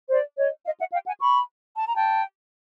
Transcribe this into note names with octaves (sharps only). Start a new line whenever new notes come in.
C5 D5
C#5 D#5
D#5 F5
E5 F#5
F5 G5
F#5 G#5
B5 C#6
A5
A#5
G5 A5